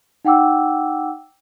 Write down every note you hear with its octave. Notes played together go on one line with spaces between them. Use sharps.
D#4 F#5 G5 D6 E6